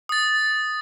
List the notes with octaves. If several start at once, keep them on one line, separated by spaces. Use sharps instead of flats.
D#6 A6